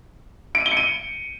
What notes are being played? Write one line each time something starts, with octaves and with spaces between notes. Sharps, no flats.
D7
D#7
G7
C#7
D#7